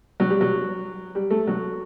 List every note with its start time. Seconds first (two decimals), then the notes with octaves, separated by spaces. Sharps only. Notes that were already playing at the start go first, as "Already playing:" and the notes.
0.20 F#3
0.30 G3
0.41 F#3
1.15 G3
1.31 A3
1.47 F#3